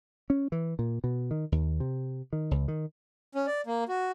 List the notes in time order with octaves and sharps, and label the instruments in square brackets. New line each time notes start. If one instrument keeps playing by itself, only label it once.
[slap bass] C#4
E3
A#2
B2
D#3
D#2
C3
D#3
C#2
D#3
[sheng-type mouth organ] C#4
D5
A#3
F#4